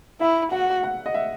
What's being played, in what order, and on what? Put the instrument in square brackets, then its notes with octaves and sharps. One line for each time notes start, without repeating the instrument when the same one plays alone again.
[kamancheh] E4 [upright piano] E5
[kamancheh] F#4 [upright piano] F#5
[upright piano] F#5
D#5
E5